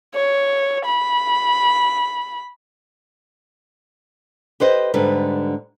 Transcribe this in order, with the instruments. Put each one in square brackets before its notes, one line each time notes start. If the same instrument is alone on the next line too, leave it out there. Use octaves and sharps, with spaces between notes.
[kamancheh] C#5
B5
[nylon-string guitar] G4 B4 C5 D#5
G#2 D3 G3 B4